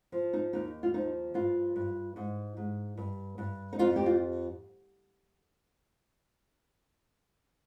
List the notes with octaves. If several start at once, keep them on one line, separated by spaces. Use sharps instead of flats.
F3
D#4
D#2 D#4
F4
F3 D#4
G2 F4
G2
G#2
G#2
G2
G2
D#4
F2 F4
G4
F4